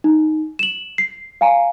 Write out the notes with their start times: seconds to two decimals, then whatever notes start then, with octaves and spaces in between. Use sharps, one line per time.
0.04 D#4
0.59 E7 F#7
0.98 C7
1.41 F5 G#5 A#5